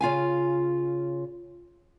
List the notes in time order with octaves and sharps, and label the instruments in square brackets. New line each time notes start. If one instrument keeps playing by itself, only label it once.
[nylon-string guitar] C#3 F4 F5 G#5